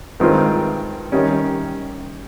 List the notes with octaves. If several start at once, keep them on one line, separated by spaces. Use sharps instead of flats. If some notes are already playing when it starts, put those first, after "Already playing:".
G2 D#3 G#3 C4 F4
D#3 G3 C#4